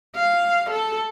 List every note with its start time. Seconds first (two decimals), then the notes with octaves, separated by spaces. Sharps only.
0.16 F5
0.70 A4